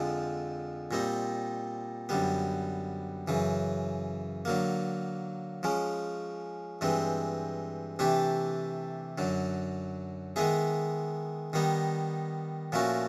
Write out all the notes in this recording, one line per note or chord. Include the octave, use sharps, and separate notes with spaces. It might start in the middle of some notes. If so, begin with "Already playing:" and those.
Already playing: F2 D3 F3 G#3
A#2 G3 C4 D#4
F#2 D3 G3 B3
F#2 C#3 E3
D3 F#3 A#3
F3 G#3 C#4
G2 E3 G#3 C4
C3 E3 A3 D4 G4
F#2 D3 F#3
D#3 G#3 B3 E4 G#4
D#3 G3 B3 D#4
A#2 F3 A3 C#4 F#4